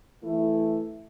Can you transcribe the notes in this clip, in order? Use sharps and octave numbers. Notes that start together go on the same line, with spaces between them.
E3 A3 E4